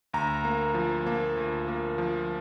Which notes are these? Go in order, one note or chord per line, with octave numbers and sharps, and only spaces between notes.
D2 A#5
A#3
F3
A#3
D2
A#3
F3